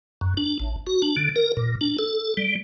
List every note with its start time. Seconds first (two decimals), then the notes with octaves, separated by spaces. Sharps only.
0.21 F#2
0.37 D4
0.60 A1
0.87 F#4
1.02 D4
1.17 D3
1.36 A#4
1.57 A#2
1.81 D4
1.99 A4
2.37 G3